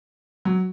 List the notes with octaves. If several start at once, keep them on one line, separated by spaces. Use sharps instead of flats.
F#3